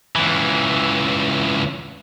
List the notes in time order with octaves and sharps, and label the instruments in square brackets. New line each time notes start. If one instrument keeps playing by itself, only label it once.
[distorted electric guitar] C#2 E3